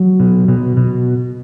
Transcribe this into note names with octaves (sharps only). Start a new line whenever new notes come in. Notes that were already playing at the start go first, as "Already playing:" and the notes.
Already playing: F#3
B2
B2
B2